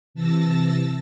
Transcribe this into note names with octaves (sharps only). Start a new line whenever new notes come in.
C3 E3 A5 E6 A6 A#6